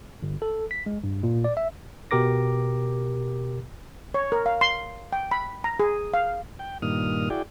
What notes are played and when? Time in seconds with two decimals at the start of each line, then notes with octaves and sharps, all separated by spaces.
0.22 G1
0.42 A4
0.71 B6
0.86 G#3
1.04 G2
1.23 A#2
1.44 D5
1.57 E5
2.11 B2 G4 A#4 D6 A#6
4.14 C#5
4.32 A#4
4.46 F5
4.61 C6
5.13 G5
5.31 B5
5.64 A#5
5.80 G#4
6.14 F5
6.59 G5
6.82 G2 A#2 D#3 D#6 F6
7.30 E4 F#4 G#4 D5 G5